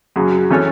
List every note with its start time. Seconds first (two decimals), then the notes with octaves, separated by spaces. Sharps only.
0.16 F#2 C#3 F#3
0.51 E3 C#4 A4 C#5